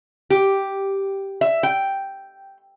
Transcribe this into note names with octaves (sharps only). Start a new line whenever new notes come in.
G4
E5
G5